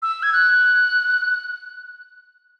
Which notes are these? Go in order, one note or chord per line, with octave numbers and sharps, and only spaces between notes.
E6
G#6
F#6